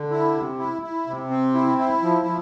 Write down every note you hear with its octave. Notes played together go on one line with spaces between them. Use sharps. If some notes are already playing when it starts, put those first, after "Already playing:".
Already playing: D3
E4
C3
E4
E4
C3
C4
E4
E4
F3
F3